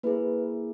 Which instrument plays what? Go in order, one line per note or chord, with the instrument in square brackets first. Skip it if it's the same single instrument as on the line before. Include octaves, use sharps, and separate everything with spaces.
[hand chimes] A#3 E4 G#4 B4